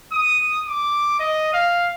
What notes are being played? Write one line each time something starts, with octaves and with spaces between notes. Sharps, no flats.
D#6
D6
D#5
F5